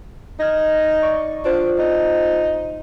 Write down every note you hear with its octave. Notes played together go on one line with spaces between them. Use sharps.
D#4 F6 G#6 A#6
D5 C#6
D4 F4 C5
D#4